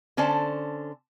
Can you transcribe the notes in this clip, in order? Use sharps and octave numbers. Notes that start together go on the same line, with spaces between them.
D3 C#4 A4 C5 D5 A5